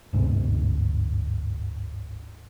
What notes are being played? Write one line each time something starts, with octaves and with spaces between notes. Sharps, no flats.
G1 D2 G#2 C3